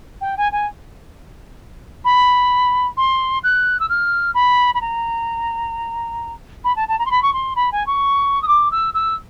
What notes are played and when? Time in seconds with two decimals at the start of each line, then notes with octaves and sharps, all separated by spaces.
0.21 G5
0.37 G#5
0.52 G#5
2.04 B5
2.97 C6
3.43 F#6
3.80 E6
3.89 F6
4.34 B5
4.74 B5
4.81 A#5
6.64 B5
6.76 A5
6.88 A5
6.99 A#5
7.06 C6
7.11 B5
7.22 C#6
7.33 C6
7.56 B5
7.72 G#5
7.86 C#6
8.42 D#6
8.48 D6
8.71 E6
8.94 E6